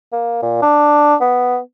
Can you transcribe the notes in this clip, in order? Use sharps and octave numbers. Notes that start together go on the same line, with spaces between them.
A#3
A#2
D4
B3